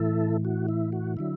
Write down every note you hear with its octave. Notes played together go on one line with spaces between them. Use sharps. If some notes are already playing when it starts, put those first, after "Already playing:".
Already playing: A2 E3 E4 A4
F#4
E4
F#4
D3 F#3 E4